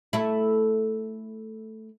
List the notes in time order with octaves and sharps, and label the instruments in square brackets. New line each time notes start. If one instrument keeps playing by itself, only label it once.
[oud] A3 E4